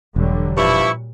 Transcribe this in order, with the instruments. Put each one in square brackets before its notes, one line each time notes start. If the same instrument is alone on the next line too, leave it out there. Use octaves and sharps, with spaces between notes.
[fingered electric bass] E1 [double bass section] D3 F#3 G3
[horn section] G2 F3 E4 [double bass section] A#2 [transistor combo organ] C#6